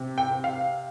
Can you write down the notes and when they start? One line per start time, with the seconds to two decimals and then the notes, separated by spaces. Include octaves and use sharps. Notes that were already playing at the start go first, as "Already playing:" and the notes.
Already playing: C3
0.18 G5
0.31 C3
0.44 F5